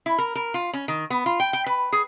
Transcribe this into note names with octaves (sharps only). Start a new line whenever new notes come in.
E4
A#4
A#4
F4
C#4
D#3
B3
F4
G5
G5
B4
G#4